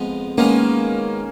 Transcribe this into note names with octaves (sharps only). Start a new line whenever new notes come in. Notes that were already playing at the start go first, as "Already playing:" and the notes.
Already playing: F2 F3 G#3 B3
D#3 G#3 A#3 B3 C#4